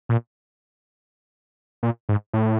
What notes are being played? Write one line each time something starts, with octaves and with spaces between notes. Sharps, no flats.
A#2
A#2
G#2
A2